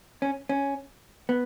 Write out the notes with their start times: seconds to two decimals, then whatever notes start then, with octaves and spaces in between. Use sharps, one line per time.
0.22 C#4
0.49 C#4
1.29 B3